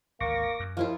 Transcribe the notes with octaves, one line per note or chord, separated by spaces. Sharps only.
G#1 D2 A#3 C#6 D6 A#6
F#2
D#2 F3 E4 F4 F5